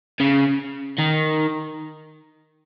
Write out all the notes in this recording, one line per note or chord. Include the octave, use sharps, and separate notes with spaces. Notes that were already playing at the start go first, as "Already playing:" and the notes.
C#3
D#3